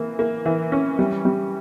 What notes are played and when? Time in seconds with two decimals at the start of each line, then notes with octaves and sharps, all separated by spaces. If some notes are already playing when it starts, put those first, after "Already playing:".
Already playing: E3 A#3
0.19 A#3
0.46 E3
0.72 C#4
0.99 G3
1.25 G3